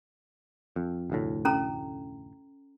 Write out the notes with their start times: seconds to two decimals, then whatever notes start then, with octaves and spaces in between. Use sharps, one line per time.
0.76 F2
1.10 F1 D2 A2
1.45 C#4 A4 A#5